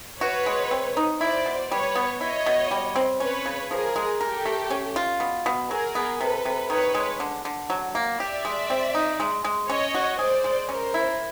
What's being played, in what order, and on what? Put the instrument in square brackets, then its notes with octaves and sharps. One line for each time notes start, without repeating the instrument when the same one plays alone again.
[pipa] F#4 [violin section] B4 C#5
[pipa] G#3
C4
D#4
[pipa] E4 [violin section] C5 D5
[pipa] B2
[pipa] G3 [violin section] B4 C#5
[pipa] B3
[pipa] E4 [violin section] C#5 D#5
[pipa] B2
G3
C4
[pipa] C#4 [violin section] B4 C#5
[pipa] C#3
[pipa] F3 [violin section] G#4 A#4
[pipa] G#3
[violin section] G4 A4 [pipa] A#4
[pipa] A3
C#4
F4
B2
B2
[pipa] F#3 [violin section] G#4 A#4
[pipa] B3
[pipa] C3 [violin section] A4 B4
[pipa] C3
[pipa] D#3 [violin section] B4 C#5
[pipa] G#3
D3
D3
F#3
A#3
[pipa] G4 [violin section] D5 E5
[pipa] G#3
C4
D#4
G#3
G#3
[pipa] C#4 [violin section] C#5 D#5
[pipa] F#4
[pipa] G#4 [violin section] C5 D5
[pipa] G#3
[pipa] C#4 [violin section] A#4 C5
[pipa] E4